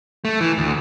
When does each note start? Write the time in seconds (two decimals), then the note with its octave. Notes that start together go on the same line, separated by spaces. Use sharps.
0.25 A3
0.41 E3
0.58 D2